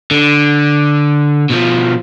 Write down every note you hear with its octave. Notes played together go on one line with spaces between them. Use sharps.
D3
B2 F3